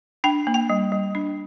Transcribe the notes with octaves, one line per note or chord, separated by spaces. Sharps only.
D4 G5
A#3
G5
G3
G3
D4